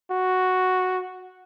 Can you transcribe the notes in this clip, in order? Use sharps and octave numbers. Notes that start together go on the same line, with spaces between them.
F#4